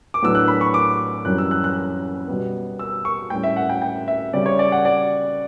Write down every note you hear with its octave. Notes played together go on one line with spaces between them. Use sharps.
D6
A2 F#3 B3 D4 E6
F#6
B5
C#6
D6
F#2 E3 G3 C#4 F#6
E6
F#6
F#6
B2 G3 B3
E6
C#6
A2 G3 C#4 G5
E5
F#5
G5
G5
E5
C#3 G3 C#4 D5
C#5
D5
F#5
D5